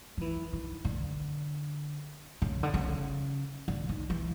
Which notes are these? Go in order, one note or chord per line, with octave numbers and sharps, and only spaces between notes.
F3
E3
D#3
D3
C#3
D3
C#3
D3
D#3
E3